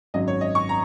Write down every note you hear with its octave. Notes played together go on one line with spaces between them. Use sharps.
G#1 F#2 F#3 D#5
C#5
D#5
C#6
A#5